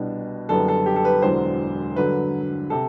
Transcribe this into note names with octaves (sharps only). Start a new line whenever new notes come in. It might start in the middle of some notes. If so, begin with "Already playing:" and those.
Already playing: C2 B2 G3 D4
F#1 F#2 D3 G3 B3 A4
A4
G4
A4
B4
E1 E2 D3 F#3 C5
G2 D3 F#3 B4
C3 A4